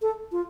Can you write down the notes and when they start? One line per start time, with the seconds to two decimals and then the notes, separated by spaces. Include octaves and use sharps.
0.02 A4
0.32 F4